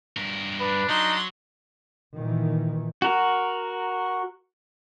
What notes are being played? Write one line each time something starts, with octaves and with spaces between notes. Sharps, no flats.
G2 A#4
D4 B4
F#3 D#4 C6
A#2 D#3 E3
F#4 A#4